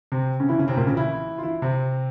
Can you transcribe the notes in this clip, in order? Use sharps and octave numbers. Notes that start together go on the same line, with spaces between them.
C3 C4
C#3 C#4
E3 E4
C#3 C#4
C3 C4
A#2 A#3
C#3 C#4
E3 E4
F4
E3 E4
C3 C4